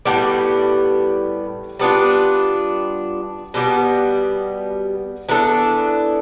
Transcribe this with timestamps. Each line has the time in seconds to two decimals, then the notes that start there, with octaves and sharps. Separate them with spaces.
0.05 A2 G3 B3
1.79 G3 B3 D4 F4
3.54 B2 G3 B3
5.29 E3 B3 D4 A4